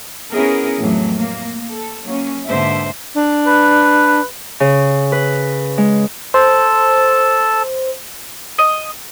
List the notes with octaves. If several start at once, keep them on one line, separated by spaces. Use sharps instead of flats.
B3 C#4 E4 G#4 A#4
F2 A2 E3 F#3
A#3
A4
F#3 A#3 C#4
G#2 B2 D3 A#3 C5 E5
D4
B4
C#3
B4
G#3
A4 C5 A5
D#5